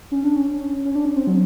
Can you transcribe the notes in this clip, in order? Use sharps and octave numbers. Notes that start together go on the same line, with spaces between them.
C#4
D4
C#4
C#4
D4
C#4
C4
F#3